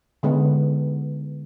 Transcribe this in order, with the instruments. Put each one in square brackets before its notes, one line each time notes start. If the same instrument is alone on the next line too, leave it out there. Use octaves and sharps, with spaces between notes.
[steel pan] D3 G#3 B3